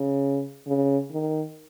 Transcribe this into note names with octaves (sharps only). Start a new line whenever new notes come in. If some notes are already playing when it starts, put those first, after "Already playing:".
Already playing: C#3
C#3
D#3